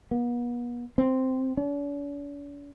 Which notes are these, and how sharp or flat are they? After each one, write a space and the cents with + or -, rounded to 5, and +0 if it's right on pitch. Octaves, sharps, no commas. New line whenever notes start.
B3 -40
C4 -5
D4 -45